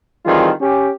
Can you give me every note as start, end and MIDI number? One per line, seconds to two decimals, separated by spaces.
0.25 0.50 51
0.25 0.50 52
0.25 0.50 55
0.25 0.50 60
0.25 0.50 65
0.25 0.50 68
0.60 0.89 61
0.60 0.89 67